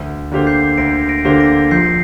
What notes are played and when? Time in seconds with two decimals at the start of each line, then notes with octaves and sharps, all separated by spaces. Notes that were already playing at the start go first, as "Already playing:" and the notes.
Already playing: D2
0.32 D3 A#3 G4 C5
0.47 G6 C7
0.78 D2 A#6 D7
1.09 A#6 D7
1.25 D3 A#3 G4 C5
1.40 A#6 D7
1.71 A#1 G6 C7